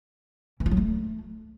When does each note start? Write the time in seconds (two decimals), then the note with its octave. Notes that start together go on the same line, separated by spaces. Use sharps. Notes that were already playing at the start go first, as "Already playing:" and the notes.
0.60 E3
0.66 F4
0.71 F#3
0.77 A3